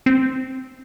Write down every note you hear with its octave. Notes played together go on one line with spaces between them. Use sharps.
C4